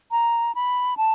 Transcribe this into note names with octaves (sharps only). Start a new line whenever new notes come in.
A#5
B5
A5